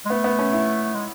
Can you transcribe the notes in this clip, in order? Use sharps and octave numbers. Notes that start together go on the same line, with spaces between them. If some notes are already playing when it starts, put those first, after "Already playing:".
G#3
A3 B3
B3
C#4
E4
G#3